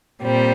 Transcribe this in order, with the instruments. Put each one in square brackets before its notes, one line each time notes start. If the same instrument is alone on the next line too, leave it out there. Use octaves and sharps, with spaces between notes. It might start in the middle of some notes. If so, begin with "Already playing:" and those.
[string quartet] A#2 G3 C4